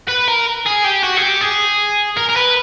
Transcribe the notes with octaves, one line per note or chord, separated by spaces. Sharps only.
B4
A#4
G#4
G4
F#4
G#4
G4
G#4
A#4
A#4
B4